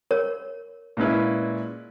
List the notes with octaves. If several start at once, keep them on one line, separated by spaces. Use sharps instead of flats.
A#4 C#5
A#2 G#3 C#4 E4 B4